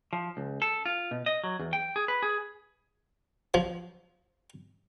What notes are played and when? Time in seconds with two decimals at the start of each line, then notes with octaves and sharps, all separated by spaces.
0.13 F3
0.37 C#2
0.62 A4
0.86 F4
1.11 B2
1.26 D#5
1.44 F#3
1.60 E2
1.73 G5
1.96 G#4
2.08 B4
2.23 G#4
3.54 F3